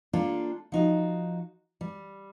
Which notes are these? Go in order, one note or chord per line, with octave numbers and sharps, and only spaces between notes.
A#3 D4 F4 G4 A4
F3 D#4 F#4
G3